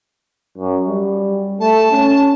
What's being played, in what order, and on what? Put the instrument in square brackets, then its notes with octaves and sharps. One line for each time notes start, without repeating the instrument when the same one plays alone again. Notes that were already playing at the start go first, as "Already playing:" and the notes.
[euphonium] F#2
G3
[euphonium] A3 [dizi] A5
[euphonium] C#4